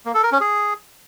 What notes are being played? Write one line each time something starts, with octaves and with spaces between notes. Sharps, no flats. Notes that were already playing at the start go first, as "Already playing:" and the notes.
A#3
A4
A#4
C#4
G#4